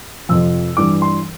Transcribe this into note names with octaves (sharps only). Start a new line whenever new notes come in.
F2 C3 F3 E6
G2 E3 G3 D6
C6